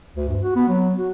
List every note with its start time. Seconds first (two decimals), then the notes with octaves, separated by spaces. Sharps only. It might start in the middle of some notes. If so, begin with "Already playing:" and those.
0.16 D2
0.28 G2
0.43 F#4
0.56 B3
0.69 F#3
0.98 F#4